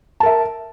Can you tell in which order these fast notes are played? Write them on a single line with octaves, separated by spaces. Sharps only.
A5 A#4 E5